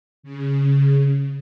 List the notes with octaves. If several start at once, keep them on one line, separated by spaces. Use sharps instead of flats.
C#3